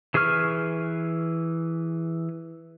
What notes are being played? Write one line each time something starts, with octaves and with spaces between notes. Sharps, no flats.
E3 G#4 B4 C#6 F6